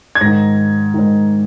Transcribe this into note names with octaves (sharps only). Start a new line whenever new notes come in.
G#6
G#2 D#3 A#6
G#2 D#3